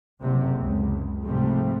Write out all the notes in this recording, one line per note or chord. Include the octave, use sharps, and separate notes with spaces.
F#1 C3 F#3
C#2
G#2 C3 F3 G3 A3